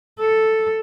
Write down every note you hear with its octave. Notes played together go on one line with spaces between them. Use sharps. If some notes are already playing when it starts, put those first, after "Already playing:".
A4